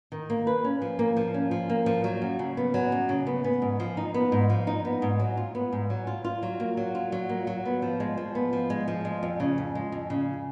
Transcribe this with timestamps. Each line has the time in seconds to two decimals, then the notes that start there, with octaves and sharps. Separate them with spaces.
0.12 D#3
0.30 A#3
0.47 B4
0.64 C#4
0.82 F3
0.99 A#3
1.17 F3
1.34 C#4
1.51 F3
1.69 A#3
1.86 F3
2.04 F#3
2.22 F#2
2.39 C#3
2.57 B3
2.74 F#3
2.92 F#2
3.09 C#3
3.27 B3
3.44 B3
3.62 G#2
3.80 F3
3.97 D#4
4.14 B3
4.32 G#2
4.50 F3
4.67 D#4
4.85 B3
5.02 G#2
5.20 F#3
5.37 F4
5.55 B3
5.73 G#2
5.90 F#3
6.07 F4
6.24 F4
6.43 F#3
6.60 A#3
6.77 F#3
6.95 F4
7.12 F#3
7.29 A#3
7.47 F#3
7.66 B3
7.82 F3
8.00 G#3
8.17 F3
8.35 B3
8.53 F3
8.70 G#3
8.88 F3
9.05 G#3
9.23 F2
9.40 C#3
9.58 F2
9.75 G#3
9.92 F2
10.10 C#3